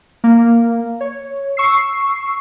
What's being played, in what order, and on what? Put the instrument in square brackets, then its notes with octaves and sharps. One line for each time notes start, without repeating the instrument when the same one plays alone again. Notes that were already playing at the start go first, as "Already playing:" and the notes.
[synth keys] A#3
C#5
C#6 E6 C7